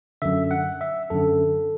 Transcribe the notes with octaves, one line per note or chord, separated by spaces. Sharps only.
F#2 D3 E5
F#5
E5
F#2 D3 A4